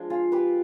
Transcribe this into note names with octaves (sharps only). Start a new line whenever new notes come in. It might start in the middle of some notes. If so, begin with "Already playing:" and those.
Already playing: F3 G#3 D4
F4 G#4
G4 B4